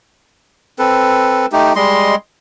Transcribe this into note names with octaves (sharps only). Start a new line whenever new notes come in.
C4 A4 B4
A3 D#4 G4
G3 G#3 D#5 C6